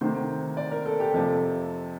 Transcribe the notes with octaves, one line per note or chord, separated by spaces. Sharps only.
D2 C3 D#3 C5
D5
A#4
A4
G4
F2 C3 F3 A4